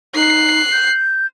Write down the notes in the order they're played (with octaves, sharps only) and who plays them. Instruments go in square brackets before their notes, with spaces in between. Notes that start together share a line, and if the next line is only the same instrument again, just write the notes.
[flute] D#4 [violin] F#6 C7
[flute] G6